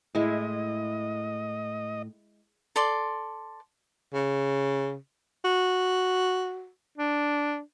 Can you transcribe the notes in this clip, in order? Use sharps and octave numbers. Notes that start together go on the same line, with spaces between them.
A2 G#3 E4 D#5
A4 D5 C6
C#3
F#4
D4